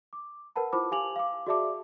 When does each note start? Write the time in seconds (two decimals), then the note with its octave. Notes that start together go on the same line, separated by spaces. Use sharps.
0.13 D6
0.56 A#4 B4 F#5 A5 B5
0.73 E4 F4 C5 A5 B5 D6
0.91 G4 F5 G#5 D6 F7 F#7
1.16 F5 D6
1.47 F#4 G#4 D5 E5 A5 D6